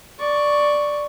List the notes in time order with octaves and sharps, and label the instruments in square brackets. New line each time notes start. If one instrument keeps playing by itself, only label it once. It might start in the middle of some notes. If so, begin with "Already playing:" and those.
[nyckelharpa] D5 C#6